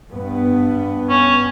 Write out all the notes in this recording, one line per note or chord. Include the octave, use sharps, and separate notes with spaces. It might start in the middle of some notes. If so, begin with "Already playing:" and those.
G2 B3
C#4